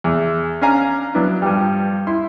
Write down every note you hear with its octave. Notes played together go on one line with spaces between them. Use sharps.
E2
C#4 D4 F5 G#5 A#5
F#3 B3 D4 E4
G2 F3 G3
E4 C6